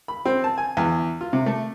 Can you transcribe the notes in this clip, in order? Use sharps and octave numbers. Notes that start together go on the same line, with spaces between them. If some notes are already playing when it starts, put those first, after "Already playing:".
B5
C4
A5
G#5
E2
F4
C3
A3